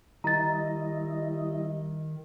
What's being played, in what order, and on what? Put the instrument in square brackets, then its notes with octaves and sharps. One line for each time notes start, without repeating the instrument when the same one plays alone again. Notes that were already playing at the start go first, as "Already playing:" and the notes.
[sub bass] D#3 [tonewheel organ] G3 E4 [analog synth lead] D#5 [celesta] A#5 A6